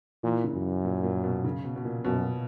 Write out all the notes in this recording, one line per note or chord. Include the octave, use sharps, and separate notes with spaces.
A#2 E3
C#3
F#2
A#2
A#2
B2
C#3
B2
B2
A#2
F#2 B2